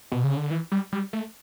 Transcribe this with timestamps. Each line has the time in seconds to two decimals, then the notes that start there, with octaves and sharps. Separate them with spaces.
0.12 B2
0.24 C#3
0.37 D3
0.51 E3
0.72 G3
0.92 G3
1.13 A3